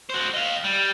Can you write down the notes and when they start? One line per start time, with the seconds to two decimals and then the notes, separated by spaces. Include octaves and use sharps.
0.10 F#4 C5
0.34 D#5 F5
0.64 G3